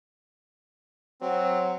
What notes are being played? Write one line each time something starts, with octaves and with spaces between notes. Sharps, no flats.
F#3 C4